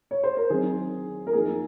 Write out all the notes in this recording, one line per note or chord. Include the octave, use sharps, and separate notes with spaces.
C#5
C5
A#4
D#3 F#3 C4 D#4 G#4
A#4
F3 A#3 D#4 G#4